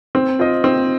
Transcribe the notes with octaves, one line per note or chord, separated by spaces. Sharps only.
C4
F4 C5 D#5
C4